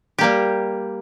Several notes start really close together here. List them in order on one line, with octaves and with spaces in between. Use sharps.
G4 A#3 G3